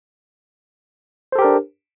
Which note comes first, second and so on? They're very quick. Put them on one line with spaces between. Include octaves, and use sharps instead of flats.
C5 A4 G4 A#4 D4